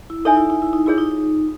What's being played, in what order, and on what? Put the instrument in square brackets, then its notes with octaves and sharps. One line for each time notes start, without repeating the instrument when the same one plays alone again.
[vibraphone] E4
[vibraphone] D#4 [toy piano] A4 C#5 E5 G#5
[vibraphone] E4
D#4
E4
D#4
[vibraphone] E4 [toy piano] F4 G#4 C#5
[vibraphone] D#4